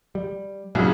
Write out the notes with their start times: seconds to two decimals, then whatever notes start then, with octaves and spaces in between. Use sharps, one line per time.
0.15 G3
0.75 C2 A#2 C#3 F#3